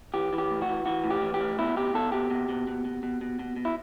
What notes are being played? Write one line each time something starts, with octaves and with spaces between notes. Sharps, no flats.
E3 G4
E3
G4
A2
F#4
E3
E3 F#4
A2
G4
E3
G4
A2
B2 E4
B2 G4
B2 A4
B2 G4
B2
B2
B2
B2
B2
B2
B2
B2
E4